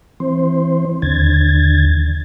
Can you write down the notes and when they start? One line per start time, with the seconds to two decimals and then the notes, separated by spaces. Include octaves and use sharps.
0.20 E3 C4 C5
1.02 D#2 D3 G#6 A6